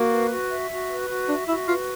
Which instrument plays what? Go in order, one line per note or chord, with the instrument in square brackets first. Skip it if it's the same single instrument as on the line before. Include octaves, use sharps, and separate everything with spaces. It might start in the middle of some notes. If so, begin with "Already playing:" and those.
Already playing: [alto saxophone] A#3 [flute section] F#4
[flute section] B4
F#4
E5
F#4
B4
F#4
[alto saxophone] D4 [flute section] E5
[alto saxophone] E4 [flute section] F#4
[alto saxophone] F4 [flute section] B4